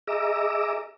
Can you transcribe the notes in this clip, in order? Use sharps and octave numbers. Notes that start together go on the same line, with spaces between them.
G#4 D#5 E5 A#5 D6 E6